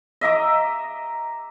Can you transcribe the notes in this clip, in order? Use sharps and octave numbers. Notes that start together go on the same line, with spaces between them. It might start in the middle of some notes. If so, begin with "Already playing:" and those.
D#5 E5 A#5 D6